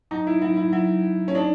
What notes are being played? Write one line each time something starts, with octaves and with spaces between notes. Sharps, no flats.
F#3 D#4
E4
F#3 E4
E4
F#3 E4
F#3
C#4
D4 D#4